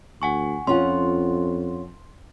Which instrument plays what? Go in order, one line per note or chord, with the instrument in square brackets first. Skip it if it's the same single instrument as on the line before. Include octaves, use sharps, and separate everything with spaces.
[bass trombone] D2 [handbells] F#5 G#5 C#6
[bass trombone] F2 [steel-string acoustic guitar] C#4 F4 F#5 [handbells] C6